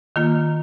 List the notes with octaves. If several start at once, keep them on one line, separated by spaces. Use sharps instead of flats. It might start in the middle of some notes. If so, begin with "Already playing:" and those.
D#3 A#3 F4